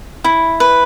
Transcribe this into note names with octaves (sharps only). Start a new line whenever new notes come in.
E4
B4